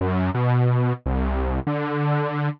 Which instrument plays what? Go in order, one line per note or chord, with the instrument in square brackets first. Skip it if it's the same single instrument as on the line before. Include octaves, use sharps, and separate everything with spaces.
[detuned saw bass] F#2
B2
C2
D3